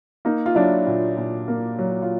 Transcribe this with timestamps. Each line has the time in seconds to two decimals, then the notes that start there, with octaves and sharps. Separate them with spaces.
0.25 A#3 D#4
0.46 F4
0.55 F#3 D4 E4
0.87 A#2
1.17 A#2
1.48 A#3
1.79 F#3
2.02 F4